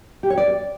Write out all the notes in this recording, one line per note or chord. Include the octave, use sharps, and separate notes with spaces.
G4
C#5
D5